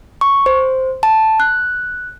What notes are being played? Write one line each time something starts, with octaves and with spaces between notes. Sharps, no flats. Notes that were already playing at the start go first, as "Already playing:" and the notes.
C#6
C5
A5
F#6